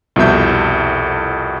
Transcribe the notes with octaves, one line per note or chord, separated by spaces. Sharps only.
C2 F2 B2 E5 G6